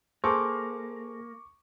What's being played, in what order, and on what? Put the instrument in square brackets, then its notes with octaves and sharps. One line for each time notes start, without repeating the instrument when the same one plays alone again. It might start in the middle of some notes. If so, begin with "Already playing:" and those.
[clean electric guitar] A#3 [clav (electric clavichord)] G#4 A4 C5 [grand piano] C#6 D6